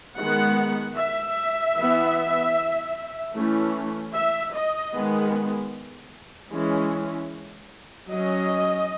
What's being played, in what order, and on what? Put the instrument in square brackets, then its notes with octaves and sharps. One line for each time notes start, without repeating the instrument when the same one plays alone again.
[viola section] D#3 G#3 B3 F#5
E5
E3 B3
E3 A3 C#4
E5
D#5
D#3 G#3 B3
E3 G#3 C#4
F#3 C#4 D#5